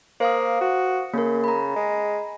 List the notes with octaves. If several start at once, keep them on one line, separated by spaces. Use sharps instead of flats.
A#3 C5 F5 D#6
F#4
C#3 A#3 A#4
A#5 B5
G#3